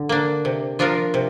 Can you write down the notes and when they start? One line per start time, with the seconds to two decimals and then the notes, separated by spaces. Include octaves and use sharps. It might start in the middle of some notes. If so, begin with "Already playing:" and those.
Already playing: D3
0.09 A#3 D4
0.45 C3
0.79 F3 D4 F4 A#4
1.14 C3